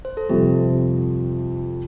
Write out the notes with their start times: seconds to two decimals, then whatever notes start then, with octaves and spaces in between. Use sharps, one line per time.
0.05 C5
0.17 A4
0.29 F2 C3 G3 C4 G4 A4